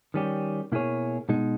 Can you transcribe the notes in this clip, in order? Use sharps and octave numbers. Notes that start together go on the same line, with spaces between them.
D#3 G3 C#4 G4
B2 A#3 E4 G#4 C#5
B2 G#3 D#4